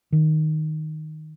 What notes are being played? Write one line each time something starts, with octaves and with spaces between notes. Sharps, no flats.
D#3